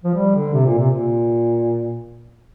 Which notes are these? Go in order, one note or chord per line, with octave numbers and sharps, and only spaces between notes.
F3
G3
D3
C3
A#2
C3
A#2